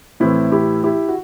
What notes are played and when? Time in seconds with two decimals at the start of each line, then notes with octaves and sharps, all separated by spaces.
0.20 A2 E3 C4 E4
0.52 E4 G4
0.84 E4 G4
1.08 F#4